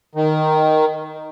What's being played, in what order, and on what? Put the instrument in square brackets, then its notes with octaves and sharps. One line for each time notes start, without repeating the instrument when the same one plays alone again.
[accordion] D#3